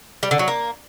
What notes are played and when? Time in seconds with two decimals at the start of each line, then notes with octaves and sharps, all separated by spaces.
0.23 G3
0.31 D3
0.39 F#3
0.48 A#3